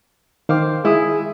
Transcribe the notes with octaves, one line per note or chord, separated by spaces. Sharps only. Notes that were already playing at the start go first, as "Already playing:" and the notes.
D#3 C5 F5 G5 D6
G#3 E4 G#4 D#6